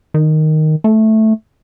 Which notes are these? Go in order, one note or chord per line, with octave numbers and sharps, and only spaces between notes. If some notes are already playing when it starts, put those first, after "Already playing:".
D#3
A3